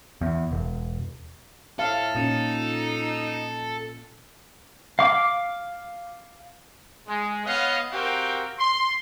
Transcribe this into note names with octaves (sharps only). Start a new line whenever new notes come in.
E2
E1
A2 A4 F5
A#2 C#4 D#4
F5 D6
G#3
B3 B4 C#5 D#5 F5
C4 F#4 G4 A#4 F5 G5
C6